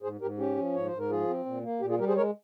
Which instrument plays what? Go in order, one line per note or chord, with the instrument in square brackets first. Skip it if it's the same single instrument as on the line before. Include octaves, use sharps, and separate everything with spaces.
[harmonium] G#2 G#4 C5
G#2 G4 A#4
C#4 G4
F3
G#2 C#5
C5
G#2
A#4
F3 F4 G#4
C4
A#2
A#3
A#2 G4
F4 G#4
G3 G4 A#4
G#4 C5
G#3 A#4 C#5